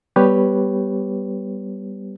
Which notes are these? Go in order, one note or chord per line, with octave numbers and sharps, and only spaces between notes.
G3 B3 G4 B4 C#5